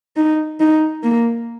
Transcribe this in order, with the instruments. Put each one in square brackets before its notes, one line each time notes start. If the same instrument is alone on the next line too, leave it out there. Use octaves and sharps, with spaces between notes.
[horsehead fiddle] D#4
D#4
A#3